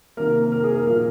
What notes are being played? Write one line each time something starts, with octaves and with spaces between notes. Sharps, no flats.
C3 D#3 A#3 A#4
A#4
G#4
A#4
A#2 F3 A#3 A#4